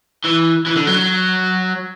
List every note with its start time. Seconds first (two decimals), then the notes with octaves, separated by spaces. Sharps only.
0.24 E3
0.66 E3
0.76 D3
0.87 F#3